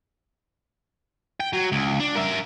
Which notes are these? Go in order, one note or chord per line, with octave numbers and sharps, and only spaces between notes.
G5
F#3
C#2
D4
A#4 E5